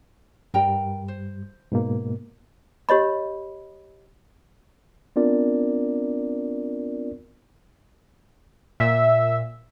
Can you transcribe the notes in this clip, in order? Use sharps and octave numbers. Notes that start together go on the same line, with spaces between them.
G2 G3 A#4 G5 A#5
C5
G#2 B2 A#3
G4 C#5 D#5 B5
B3 C4 D4 F4 A#4 D5
A#2 E5